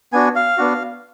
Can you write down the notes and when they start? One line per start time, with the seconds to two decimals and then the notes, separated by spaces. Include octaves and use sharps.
0.13 B3 D4 F#4 G#5
0.36 F5
0.57 B3 D4 F#4